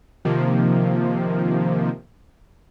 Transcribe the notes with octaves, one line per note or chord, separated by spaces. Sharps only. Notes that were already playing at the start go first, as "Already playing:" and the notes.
C3 D#3 F3 A#3